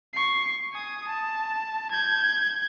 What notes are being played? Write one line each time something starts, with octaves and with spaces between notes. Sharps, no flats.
C#6 C7
G#5 D#6
A5
G6 G#6